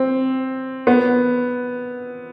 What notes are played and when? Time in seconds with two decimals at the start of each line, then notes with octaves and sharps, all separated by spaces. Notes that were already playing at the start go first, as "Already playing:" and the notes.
Already playing: C4
0.87 B3